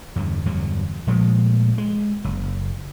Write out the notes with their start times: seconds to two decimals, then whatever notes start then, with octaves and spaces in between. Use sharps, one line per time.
0.16 E2 G2 D3
0.46 E2 G2 D3 F#3
1.07 A#2 F3 G#3 A3
1.78 G#3
2.24 F#1